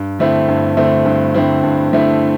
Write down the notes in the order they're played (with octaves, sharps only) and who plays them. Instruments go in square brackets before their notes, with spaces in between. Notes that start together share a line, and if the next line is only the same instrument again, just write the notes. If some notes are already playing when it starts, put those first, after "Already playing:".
Already playing: [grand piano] G2
D3 A3 C4 E4
G2
D3 A3 C4 E4
G2
D3 A3 C4 E4
G2
D3 A3 C4 E4